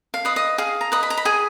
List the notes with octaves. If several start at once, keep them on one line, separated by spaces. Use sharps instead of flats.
F5
B4 D#5
D#5
G#4 F5
A#5
B4 D#5
B5
A#5
B5
G#4 G#5